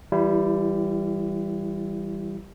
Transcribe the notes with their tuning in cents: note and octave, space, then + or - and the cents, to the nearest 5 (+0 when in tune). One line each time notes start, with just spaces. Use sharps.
E3 +0 G3 +0 E4 +35